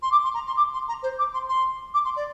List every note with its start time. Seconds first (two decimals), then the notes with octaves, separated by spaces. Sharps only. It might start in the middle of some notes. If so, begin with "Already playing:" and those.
0.02 C6
0.11 D6
0.23 C6
0.34 A#5
0.46 C6
0.56 D6
0.73 C6
0.88 A#5
1.02 C5
1.18 D6
1.33 C6
1.48 C6
1.93 D6
2.04 C6
2.16 D5